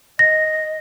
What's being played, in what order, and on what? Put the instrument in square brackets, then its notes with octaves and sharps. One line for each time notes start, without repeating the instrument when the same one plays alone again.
[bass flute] D#5 [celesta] A#6